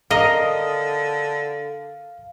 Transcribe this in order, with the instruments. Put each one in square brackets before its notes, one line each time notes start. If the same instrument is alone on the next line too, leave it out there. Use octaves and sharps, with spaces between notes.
[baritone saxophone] D3 [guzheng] A#4 D#5 [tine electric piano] F5